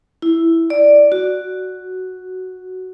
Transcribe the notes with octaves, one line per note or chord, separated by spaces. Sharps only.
E4
D5
F#4